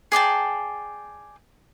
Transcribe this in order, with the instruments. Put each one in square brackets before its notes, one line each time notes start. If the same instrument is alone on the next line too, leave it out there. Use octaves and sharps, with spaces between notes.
[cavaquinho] G#4 D5 G5 A5